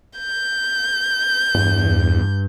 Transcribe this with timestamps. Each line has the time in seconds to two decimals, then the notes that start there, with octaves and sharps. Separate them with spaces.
0.19 G6
1.55 E2 G2